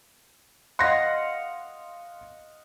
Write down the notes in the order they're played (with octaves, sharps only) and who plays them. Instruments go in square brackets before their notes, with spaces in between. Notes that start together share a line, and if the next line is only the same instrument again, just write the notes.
[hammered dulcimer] D#5 F5 F#5 [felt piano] C6 A#6